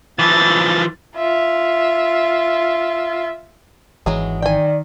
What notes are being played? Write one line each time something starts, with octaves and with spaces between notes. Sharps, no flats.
E3 F3 A6
F4 E5
G#1 E3 F#3 G#3 G#4
D#3 D5 G5 G#5